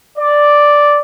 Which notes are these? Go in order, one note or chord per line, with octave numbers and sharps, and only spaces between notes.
D5